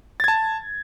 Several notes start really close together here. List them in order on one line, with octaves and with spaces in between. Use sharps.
A6 G#6 A5